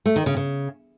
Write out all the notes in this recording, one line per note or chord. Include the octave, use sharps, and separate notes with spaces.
A3
D#3
C#3
C#3